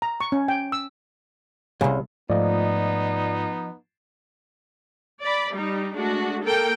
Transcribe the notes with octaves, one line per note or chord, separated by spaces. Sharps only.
A#5
C#6
C#4
G5
E6
C2 F#2 C#3
G#2 F3 A3 B3 D#4 F4 D5 D#5
D5 B5
G3 D#4
G#3 A3 D4 F#4
A#3 A4 A#4 G5